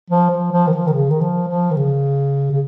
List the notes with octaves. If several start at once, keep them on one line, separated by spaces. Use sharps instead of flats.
F3
F3
F3
D#3
F3
D#3
C#3
D#3
F3
F3
D#3
C#3
C#3